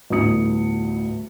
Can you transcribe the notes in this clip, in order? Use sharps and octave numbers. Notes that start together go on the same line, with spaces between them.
G1 D2 A2 D#6 C#7